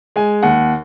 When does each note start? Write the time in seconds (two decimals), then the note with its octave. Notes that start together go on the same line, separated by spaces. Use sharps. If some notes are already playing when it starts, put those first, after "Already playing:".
0.16 G#3 G#5
0.43 D#2 F#5